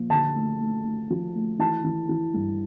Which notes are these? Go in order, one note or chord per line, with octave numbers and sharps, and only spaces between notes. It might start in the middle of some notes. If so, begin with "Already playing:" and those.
Already playing: A#2 F3
D3 A5
A3
A3
A3
F3
A3
E3 A5
E3
E3
G2